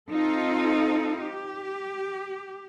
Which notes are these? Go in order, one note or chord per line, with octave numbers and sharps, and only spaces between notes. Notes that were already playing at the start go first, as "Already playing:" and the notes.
C4 D#4 F4 A4
G4